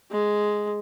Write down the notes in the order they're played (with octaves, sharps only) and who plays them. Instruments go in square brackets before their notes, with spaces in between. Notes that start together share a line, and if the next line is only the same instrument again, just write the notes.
[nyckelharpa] G#3